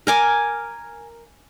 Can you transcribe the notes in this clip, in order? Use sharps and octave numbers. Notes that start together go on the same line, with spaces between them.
A#4 G#5 D6